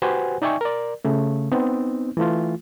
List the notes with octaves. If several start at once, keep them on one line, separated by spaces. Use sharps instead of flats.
F#4 G4 B4 C5 F#5 G#5
D#4 D5 E5 G5 G#5 C#6
A#4 D5
C#3 A3
B3 C4 D#4
E3 A3 F4